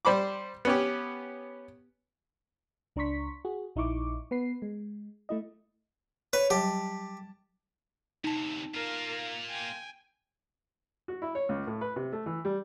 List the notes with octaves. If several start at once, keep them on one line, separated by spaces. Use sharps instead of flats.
G3 C5 B5 D6
B3 C#4 G4
C#2 D4 A#5 C6 C#6 B6
F#4 G#4
A#1 D#4 E4 C#6 D6
B3 B4 C7
G#3
A3 E4 D#5
B4 C#5
F#3 G3 G4 A5
D2 C3 D#4 A5
A#3 F4 A#4 F5
G5 G#5
F#4
E4
C#5
C#2
A2
B4
C3
A3
E3
G3